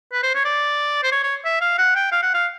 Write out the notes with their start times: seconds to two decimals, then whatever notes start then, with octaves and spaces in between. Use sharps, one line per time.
0.13 B4
0.23 C5
0.35 C#5
0.45 D5
1.03 C5
1.12 C#5
1.23 C#5
1.45 E5
1.61 F5
1.78 F#5
1.95 G5
2.12 F5
2.22 F#5
2.34 F5